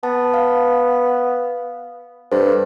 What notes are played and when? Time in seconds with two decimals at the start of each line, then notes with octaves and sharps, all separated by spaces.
0.03 B3 A5
0.34 F5
2.32 G2 A4 C5